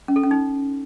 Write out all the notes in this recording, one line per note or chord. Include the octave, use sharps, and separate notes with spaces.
C#4
A4
C#4
D#4